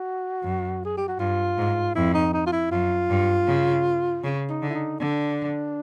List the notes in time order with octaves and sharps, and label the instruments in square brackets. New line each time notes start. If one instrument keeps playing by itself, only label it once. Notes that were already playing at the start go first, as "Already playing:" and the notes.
Already playing: [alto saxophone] F#4
[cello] F#2
[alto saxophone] G#4
G4
F#4
[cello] G2 [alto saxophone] F4
[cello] G#2
[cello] F2 [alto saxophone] E4
[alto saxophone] D#4
D#4
F4
E4
[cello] F#2 [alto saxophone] F4
[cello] G2
C#3
C#3
[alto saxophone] D#4
[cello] D3
[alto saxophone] E4
D#4
[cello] D3 [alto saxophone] D4